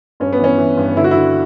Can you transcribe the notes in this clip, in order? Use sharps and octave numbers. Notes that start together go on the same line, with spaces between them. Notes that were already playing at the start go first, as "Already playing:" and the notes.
G2 C#4
B3
E3 C#4
E3
G2
D3 E4
F#4
D3 E4